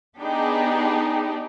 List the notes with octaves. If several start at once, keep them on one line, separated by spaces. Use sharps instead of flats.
B3 D4 D#4 G4 G#4